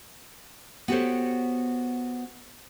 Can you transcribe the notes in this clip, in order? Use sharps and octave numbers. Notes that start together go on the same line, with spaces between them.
B3 F#4 G4 A4 C5 C#5